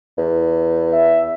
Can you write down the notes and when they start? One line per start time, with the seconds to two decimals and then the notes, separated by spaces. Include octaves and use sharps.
0.17 E2
0.93 E5